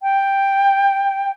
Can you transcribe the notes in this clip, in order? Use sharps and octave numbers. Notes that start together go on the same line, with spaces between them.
G5